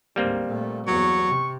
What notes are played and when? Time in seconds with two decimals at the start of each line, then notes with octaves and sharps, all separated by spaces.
0.16 D2 G#2 G3 A#3 C4
0.47 A#2 A3
0.87 G1 E2 F#3 C#6
1.28 C3